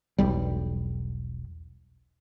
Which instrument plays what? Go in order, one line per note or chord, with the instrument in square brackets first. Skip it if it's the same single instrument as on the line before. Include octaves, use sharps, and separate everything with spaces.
[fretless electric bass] E1 B1 G3